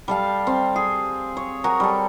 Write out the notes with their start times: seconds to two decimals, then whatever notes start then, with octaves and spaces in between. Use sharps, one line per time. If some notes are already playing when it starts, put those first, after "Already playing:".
0.08 G3 A4 F5
0.47 C4
0.76 G#4
1.37 C#5
1.64 F#4 A#4 G#5
1.80 G3 A4